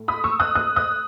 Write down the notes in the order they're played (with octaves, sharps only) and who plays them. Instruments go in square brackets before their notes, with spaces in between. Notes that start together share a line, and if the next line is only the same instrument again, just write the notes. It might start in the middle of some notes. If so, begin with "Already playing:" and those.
Already playing: [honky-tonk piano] A2 A3
B5 D#6
C#6 E6
D#6 F#6
D#6 F#6
D#6 F#6